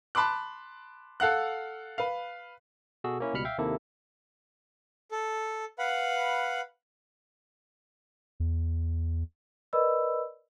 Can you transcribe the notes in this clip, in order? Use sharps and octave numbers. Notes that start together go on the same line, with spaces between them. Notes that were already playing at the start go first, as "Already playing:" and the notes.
A5 B5 C6 D6 F#6
A4 F5 F#5 F#6
B4 F5
B2 F#4 G#4 A4 E6
A#3 C#4 E4
C#2 B2 G3 B5 F6 C#7
E5 F5 G5
D#2 C3 D#3 A#3 E4 A4
A4
B4 F5 F#5 B5
E2
A#4 B4 D5 D#5 B5 E6